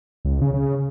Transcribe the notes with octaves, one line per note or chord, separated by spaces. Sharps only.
C#2
C#3
C#3